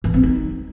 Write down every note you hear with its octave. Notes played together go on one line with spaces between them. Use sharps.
E3
C4
D#4